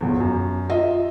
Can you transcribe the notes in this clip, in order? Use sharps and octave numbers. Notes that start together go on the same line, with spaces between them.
G1 E2
F#2
F4 D#5 E5